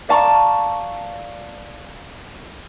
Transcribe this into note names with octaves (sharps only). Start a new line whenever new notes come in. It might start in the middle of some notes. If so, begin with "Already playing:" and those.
D5 F5 A5 A#5 C#6